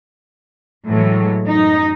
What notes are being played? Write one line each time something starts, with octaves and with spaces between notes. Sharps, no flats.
A2 E3 F#3 G#3
F#2 D#4